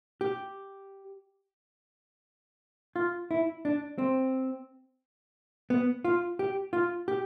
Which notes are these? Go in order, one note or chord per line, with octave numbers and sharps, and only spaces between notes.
G4
F4
E4
D4
C4
B3
F4
G4
F4
G4